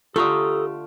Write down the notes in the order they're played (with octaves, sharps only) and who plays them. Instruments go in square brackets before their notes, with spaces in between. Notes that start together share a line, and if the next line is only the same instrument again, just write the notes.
[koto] D3 A3 [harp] F4 [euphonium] G4 [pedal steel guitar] A4 A#5 D#6